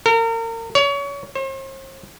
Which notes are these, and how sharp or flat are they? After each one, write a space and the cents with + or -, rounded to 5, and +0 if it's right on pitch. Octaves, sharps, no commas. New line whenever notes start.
A#4 -35
C#5 +30
C5 +45